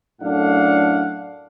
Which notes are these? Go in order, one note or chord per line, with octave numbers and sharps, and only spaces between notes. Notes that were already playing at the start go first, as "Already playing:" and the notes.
F#2 A2 A3 D4 F5 F#5